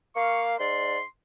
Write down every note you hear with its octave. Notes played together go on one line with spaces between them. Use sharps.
A#3 F5 C#6
G#2 D5 C6